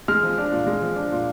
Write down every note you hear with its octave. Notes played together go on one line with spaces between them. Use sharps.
G#3 F6
F3
D4
A#2
G#3
F3
D4
A#2